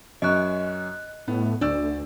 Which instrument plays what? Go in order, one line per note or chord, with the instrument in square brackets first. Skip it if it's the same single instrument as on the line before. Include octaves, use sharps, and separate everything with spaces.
[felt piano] F#2 C#4 C#6 [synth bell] D#5 F#6
[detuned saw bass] A2 [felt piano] B3
[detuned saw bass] D2 [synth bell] D4 [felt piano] D5 E6